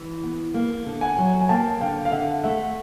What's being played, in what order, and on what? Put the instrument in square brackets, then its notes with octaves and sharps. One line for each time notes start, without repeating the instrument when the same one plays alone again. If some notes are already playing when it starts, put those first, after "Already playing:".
Already playing: [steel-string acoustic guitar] E3
B3
A#3
D3
[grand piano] F#5 G#5
[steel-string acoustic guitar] F#3
[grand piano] G#5
[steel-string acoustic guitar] A#3 [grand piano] G5 A5
[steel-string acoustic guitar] D3 [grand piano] F5 G5
[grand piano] F5
[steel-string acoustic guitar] D3 [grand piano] E5 F#5
[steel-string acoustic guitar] A3 [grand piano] E5 F#5